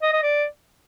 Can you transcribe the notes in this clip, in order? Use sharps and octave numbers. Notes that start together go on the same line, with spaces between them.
D#5
D#5
D5